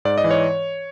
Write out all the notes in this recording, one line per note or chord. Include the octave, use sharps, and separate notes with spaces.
G#2 D5
D#5
E3
C#5